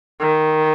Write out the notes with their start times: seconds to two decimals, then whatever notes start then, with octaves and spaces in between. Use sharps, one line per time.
0.20 D#3